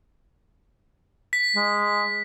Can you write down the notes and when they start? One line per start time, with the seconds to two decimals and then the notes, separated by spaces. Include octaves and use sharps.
1.33 B6
1.56 G#3